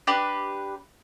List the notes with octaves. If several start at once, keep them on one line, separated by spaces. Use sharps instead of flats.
D4 G4 B4